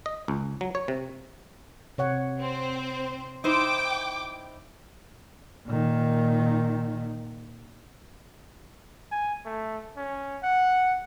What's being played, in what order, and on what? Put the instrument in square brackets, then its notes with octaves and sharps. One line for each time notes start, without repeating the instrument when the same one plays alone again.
[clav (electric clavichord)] D#5
C#2
F#3
C#5
C3
[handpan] C3 C#5 F#5
[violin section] C4 C5
[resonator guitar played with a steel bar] D#4 E4 C5 [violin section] G5 D6
[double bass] A#2 D#3
[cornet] G#5
A3
C#4
F#5